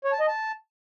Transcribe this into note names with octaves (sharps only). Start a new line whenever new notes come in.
C#5
A5
D#5
A5